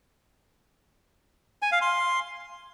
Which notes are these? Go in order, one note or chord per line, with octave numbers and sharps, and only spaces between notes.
G#5
F5
C6